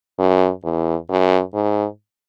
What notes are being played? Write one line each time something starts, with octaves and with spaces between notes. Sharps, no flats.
F#2
E2
F#2
G#2